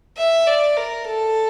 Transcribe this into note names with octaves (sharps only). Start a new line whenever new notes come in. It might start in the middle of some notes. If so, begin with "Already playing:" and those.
E5
D5
A#4
A4